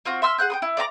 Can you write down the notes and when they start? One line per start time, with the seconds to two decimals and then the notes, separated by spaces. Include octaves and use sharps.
0.05 C4 F4 F#4
0.22 E5 C6 E6 F6
0.38 G#4 F#5 F#6 G6
0.50 G5 C6 D#6
0.62 E4
0.77 D5 E5 A#5 D6